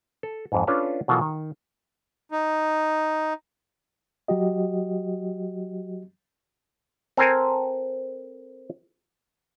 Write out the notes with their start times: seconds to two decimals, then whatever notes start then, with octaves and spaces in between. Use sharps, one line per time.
0.23 A4
0.52 F2 G#2
0.67 C#4 D4 F4 A4 B4 C#5
1.08 B2 E3 F#3 F4 A4 A#4
1.21 D#3
2.32 D#4
4.28 F#3 F#4 G4 D#5
7.17 C4 A4 A#4 C5 G#5